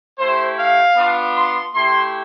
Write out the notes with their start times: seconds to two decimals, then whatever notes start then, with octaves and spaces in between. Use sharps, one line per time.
0.18 A3 E4 G4 C5
0.57 F5
0.96 B3 D4 F4
1.35 C6
1.74 A3 E4 G4 C6